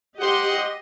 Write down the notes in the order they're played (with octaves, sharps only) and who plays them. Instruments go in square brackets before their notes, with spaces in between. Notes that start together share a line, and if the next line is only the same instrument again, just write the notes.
[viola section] G4 D#5 [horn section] C5 F#5 C6